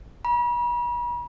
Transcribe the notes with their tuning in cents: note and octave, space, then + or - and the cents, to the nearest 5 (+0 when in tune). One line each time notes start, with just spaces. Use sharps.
B5 -45